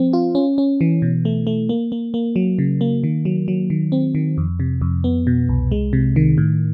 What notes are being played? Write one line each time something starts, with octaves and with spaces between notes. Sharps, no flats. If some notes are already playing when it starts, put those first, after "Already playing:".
Already playing: F3 C4
F4
C#4
C#4
E3
B2
A3
A3
A#3
A#3
A#3
F#3
C#3
A#3
D#3
F#3
F#3
D#3
C4
D#3
F2
C3
F2
B3
B2
C2
G#3
C3
D#3
A2